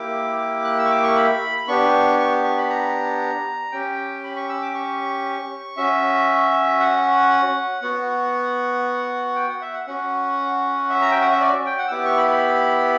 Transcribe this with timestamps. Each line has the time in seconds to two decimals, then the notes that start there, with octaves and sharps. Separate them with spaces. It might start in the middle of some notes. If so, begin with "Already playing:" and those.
Already playing: A#3 E4 G4 D6
0.64 F#6
0.78 E6
0.85 C#6
0.91 D6
1.03 C#6
1.16 B5
1.68 B3 D4 G4 C#6
2.19 C#6
2.44 C#6
2.57 B5
2.70 A#5
3.72 C#4 G4 G5
4.24 B5
4.36 C#6
4.49 E6
4.61 D6
4.75 C#6
5.77 C#4 F#4 E5
6.80 F#5
7.82 B3 F#4 F#5
9.35 G5
9.49 F#5
9.61 E5
9.74 F#5
9.87 C#4 F#4 F#5
10.90 E5
11.02 A#5
11.11 G5
11.21 F#5
11.31 E5
11.41 D5
11.66 G5
11.78 F#5
11.88 E6
11.91 B3 E4 G4 D6
12.05 C#6
12.17 B5
12.31 B5